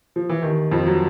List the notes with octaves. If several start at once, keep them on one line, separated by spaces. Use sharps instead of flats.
F3
E3
D#2 D#3
F2 F3
F#3